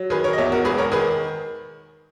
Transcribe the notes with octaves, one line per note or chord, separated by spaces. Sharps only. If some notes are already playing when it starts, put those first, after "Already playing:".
Already playing: F#3
D#3 G#4 B4
A#4 C#5
D#5
E2 C#5 E5
F#4 A#4
E1 G#4 B4
A#4 C#5
D#3 G#4 B4